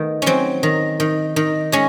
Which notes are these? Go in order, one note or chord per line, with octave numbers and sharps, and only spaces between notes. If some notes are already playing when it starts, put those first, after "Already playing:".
Already playing: D#3 A3 B3
F#3 C4 C#4
D#3
D#3
D#3
G#3 C#4